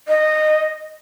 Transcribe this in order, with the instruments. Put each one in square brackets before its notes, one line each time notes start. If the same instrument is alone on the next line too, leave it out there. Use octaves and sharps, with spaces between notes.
[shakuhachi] D#5